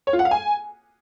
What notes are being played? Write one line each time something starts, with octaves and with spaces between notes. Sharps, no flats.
C#5
F4
F#5
F5
G#5